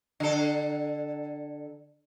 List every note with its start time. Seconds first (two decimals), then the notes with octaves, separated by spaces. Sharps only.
0.20 D3 A4